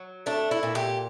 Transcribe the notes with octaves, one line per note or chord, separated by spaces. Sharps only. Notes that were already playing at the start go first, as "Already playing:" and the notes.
Already playing: F#3
A3 D4
E4
A#2
G4